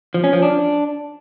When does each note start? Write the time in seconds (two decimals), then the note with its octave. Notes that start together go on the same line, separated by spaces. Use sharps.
0.14 F3
0.24 C#4
0.33 F3
0.42 D4